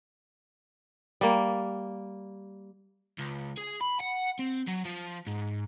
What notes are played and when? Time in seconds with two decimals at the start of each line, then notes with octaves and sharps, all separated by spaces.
1.21 G3 A#3
3.18 C#2
3.57 G#4
3.81 B5
4.01 F#5
4.39 C4
4.67 F#3
4.85 F3
5.27 G#2